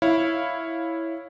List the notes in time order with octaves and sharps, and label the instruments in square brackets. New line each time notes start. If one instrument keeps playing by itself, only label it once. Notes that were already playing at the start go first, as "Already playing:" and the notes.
[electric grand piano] E4 C#5 F5